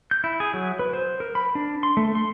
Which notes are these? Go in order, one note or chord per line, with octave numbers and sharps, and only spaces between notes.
G6
E4
G#4
F#3
B4
C5
A#4
B5
D4
C6
A3
C6